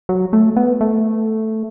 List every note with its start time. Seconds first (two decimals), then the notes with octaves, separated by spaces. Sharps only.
0.09 F#3
0.33 A3
0.57 B3
0.81 A3